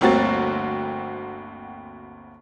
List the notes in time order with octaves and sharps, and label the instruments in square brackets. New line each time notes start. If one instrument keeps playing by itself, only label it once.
[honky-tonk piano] G1 D2 A#3 C4 F#4 A6